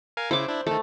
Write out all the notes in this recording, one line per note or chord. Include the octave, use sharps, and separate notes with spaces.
A#4 F5 G#5
C#3 E4 C5 D6
D4 E4
D#3 A3 A4